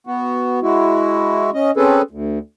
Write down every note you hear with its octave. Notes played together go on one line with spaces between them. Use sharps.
B3 F#4
G#3 E4 F#4
C#4 D#5
C4 C#4 G#4 A4 B4
D2